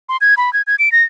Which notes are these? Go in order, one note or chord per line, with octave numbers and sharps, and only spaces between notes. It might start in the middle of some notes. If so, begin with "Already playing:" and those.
C6
G#6
B5
G#6
G#6
D7
A#6